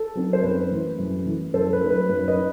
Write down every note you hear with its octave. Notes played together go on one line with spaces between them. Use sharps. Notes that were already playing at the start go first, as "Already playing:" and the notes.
Already playing: A4
F#3 C4 D#4
C5
F#2 B4
E3 A3
F#2
E3 A3
F#2 A4 C5
A4
B4
F#3 A3 D#4
B4
F#2 B4
B4 D#5
D#4